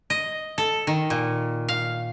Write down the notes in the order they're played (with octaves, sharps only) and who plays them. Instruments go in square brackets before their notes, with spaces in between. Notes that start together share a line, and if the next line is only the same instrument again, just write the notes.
[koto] D#5
A4
D#3
A#2
F5